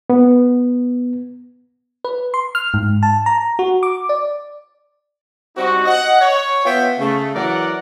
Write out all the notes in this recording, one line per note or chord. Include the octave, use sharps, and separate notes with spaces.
B3
B4
C6
F6
G#2
A5
A#5
F#4
D6
D5
G3 C4 D#4 F#4
D#5 F#5
C#5
B3 F4 E5 G5
C#3 A3
E3 F#3 A#4 D5 F#5